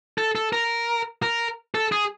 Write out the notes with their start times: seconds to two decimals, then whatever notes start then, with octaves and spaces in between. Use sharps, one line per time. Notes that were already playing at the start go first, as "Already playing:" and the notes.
0.18 A4
0.35 A4
0.53 A#4
1.22 A#4
1.75 A4
1.92 G#4